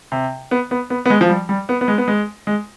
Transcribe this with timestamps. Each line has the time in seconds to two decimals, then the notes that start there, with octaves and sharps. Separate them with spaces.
0.12 C3
0.51 B3
0.71 B3
0.90 B3
1.06 B3
1.10 G#3
1.21 F3
1.29 G3
1.49 G3
1.69 B3
1.81 B3
1.88 G#3
1.98 B3
2.08 G#3
2.47 G#3